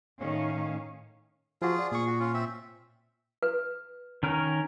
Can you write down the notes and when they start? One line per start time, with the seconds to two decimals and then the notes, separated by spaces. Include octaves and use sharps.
0.21 A2 D#3 C#4 C#5 F5
1.62 F3 F4 F#4 G#4
1.79 D5
1.92 A#2 G#4 C#6
2.07 F#4
2.20 C#4 F4
2.34 C4 E5
3.43 B4
4.23 D#3 C#4 A#4